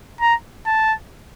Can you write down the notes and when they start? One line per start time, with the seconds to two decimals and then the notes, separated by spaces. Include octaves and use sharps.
0.21 A#5
0.66 A5